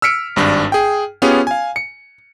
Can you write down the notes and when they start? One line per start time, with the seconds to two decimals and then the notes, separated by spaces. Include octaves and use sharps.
0.02 E6 F6 B6 C#7 D7
0.36 G#1 G2 D4
0.72 G#4 G5
1.22 B3 C#4 F4 G4 G#4
1.47 F5 G#5
1.76 C#7